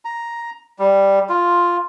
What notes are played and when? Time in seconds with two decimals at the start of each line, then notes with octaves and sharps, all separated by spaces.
0.05 A#5
0.79 G3
1.29 F4